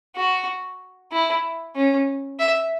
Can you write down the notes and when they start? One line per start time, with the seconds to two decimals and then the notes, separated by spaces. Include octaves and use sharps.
0.16 F#4
1.12 E4
1.76 C#4
2.40 E5